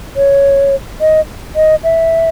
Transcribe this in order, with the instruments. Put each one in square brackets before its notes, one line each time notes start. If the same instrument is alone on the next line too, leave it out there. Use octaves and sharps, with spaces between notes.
[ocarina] C#5
D#5
D#5
E5